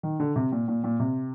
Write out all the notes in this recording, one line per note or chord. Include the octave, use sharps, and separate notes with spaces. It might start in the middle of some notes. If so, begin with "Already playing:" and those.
D#3
D3
C3
A#2
A#2
A#2
C3